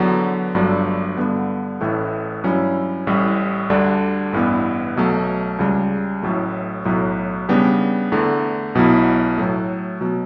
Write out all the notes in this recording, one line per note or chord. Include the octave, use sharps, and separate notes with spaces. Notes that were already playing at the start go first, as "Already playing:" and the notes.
Already playing: E2 D3 F#3 B3
G1 G2 F#3 A3 D4
G2 D3 G3 B3
A1 A2 E3 A3
G2 F#3 C#4 E4
A1 A2 G3
D2 D3 G3 D4
A1 G2 E3 B3
B1 B2 F#3 A3
C#2 C#3 G3
A1 A2 F#3 A3
B1 A2 F#3
C#3 G3 B3 D4 G4
E2 D3 A3
B1 B2 F#3 B3 E4
A2 F#3 A3
B2 F#3